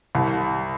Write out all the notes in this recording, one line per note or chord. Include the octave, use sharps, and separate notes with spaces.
C2